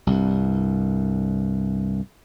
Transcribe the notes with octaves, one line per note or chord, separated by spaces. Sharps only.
C2 G2